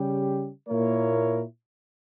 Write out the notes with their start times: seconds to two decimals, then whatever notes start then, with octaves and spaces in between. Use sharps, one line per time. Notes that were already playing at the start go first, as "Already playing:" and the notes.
Already playing: C#3 G3 C#4 G4
0.67 A#2 A#3 E4 A#4 C#5